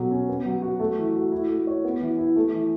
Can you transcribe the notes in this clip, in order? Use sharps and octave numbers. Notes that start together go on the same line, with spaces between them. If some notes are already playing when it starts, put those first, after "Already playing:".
Already playing: B2 F#3 A4
C#4
B3
F#3
F#4
A3
E3
F#4
E4
A3
C#5
B3
E3
E4
A3
E3